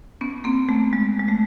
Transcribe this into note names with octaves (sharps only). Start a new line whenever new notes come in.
B3 C#4
A#3 C4
A3 B3
G#3
G#3
A3